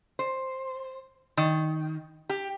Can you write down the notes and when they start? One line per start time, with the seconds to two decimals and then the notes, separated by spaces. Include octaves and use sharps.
0.19 C5
1.37 D#3
2.29 G4